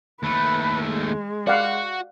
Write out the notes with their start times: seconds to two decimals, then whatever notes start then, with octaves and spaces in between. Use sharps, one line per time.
0.23 D#2 A3 B4
0.87 G#3
1.47 F#4 D5 F5 F#5